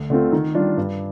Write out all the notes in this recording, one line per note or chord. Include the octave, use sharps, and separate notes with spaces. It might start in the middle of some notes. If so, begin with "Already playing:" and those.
Already playing: D2
D3 A3 C4 F4
D#3
G3 D4 F4
G2